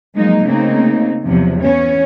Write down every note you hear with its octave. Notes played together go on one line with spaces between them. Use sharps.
F3 F#3 G#3 A#3 D#4
C#3 A3 A#3 C4 D#4
E2 C3 F3 F#3
E3 B3 C#4 C#5